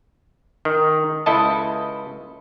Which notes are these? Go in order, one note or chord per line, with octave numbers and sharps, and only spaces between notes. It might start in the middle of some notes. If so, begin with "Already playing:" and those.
D#3
C#2 E4 A4 D#5 A5